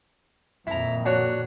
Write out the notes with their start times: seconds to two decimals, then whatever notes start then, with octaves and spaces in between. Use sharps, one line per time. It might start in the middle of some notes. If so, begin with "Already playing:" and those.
0.67 F2 A#2 D#3 E4 A#5
1.05 D4 F#4 C#5